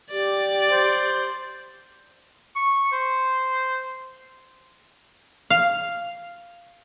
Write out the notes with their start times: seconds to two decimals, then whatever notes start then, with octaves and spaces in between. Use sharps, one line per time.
0.11 G4 D5
0.70 C5
2.56 C#6
2.92 C5
5.50 F5